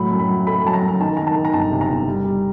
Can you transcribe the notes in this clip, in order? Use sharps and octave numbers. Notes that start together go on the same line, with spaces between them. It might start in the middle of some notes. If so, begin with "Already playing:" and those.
Already playing: A2 F#3 B5
F#2
B5
F#3
A3 B5
F#3 A5
A#5
F#2
A#5
D#3 A5
D#3 A#5
A5
D#3
A#5
G1 A5
C3
A#5
G1
G3
G3